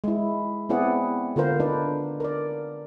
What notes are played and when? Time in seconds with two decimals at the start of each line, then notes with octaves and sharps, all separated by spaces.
0.04 G#3 E4
0.69 B3 C4 E4 G#4 D5 F#5
1.36 D3 F4 A#4 C5
1.60 D4 D#4 B4 D5
2.20 A#4 D5